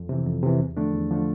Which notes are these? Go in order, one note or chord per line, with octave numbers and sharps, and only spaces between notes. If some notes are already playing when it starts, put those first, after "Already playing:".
Already playing: F2
C3 E3
F2
C3 E3
E2
D3 F3 A3 D4
E2
D3 F3 A3 D4